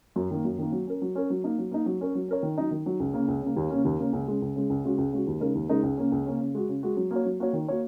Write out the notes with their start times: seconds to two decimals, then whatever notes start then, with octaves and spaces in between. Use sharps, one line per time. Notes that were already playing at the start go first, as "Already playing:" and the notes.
0.16 F#2
0.31 D#3 A#3
0.45 F#2
0.59 D#3 A#3
0.72 F#3
0.87 C#4 A#4
1.02 F#3
1.15 C#4 A#4
1.30 F#3
1.44 A#3 D#4
1.58 F#3
1.71 A#3 D#4
1.86 F#3
2.01 C#4 A#4 C#5
2.15 F#3
2.28 C#4 A#4 C#5
2.43 D#3
2.58 F#3 D#4
2.71 D#3
2.86 F#3 D#4
3.00 C#2
3.13 C#3 A#3
3.28 C#2
3.42 C#3 A#3
3.57 D#2
3.70 C#3 A#3 C#4
3.85 D#2
3.99 C#3 A#3 C#4
4.13 C#2
4.28 C#3 G#3
4.42 C#2
4.56 C#3 G#3
4.70 C#2
4.84 C#3 G#3 F#4
4.98 C#2
5.12 C#3 G#3 F#4
5.27 D#2
5.40 C#3 G#3 D#4 A#4
5.55 D#2
5.69 C#3 G#3 D#4 A#4
5.83 C#2
5.97 C#3 A#3 C#4
6.12 C#2
6.26 C#3 A#3 C#4
6.40 C#3
6.55 G#3 F#4
6.69 C#3
6.83 G#3 F#4
6.97 F#3
7.11 A#3 F#4 C#5
7.25 F#3
7.40 A#3 F#4 C#5
7.53 D#3
7.68 A#3 F#4 C#5